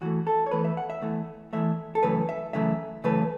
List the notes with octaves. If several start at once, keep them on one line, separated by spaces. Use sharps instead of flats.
E2 E3 A3 F#4
A4
C#5
E2 E3 A3 B4
E5
F#5
E5
E2 E3 A3
E2 E3 A3 E5
A4
F#2 C#3 E3 A3 B4
E5
F#2 C#3 E3 A3 E5
F#2 C#3 E3 A3 B4